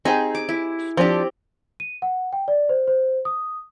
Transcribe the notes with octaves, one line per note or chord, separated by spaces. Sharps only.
C4 D#4 G4 G#4 G#5
D6
E4
F3 C4 D4 G4
D#7
F#5
G5
D5
C5
C5
D#6